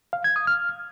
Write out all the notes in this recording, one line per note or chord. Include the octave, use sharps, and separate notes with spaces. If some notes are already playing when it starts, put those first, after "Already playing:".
F5
G#6
D#6
F6